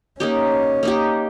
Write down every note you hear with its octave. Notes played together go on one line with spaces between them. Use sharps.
A#3 C#4 D#4 G4
A#3 D#4 G4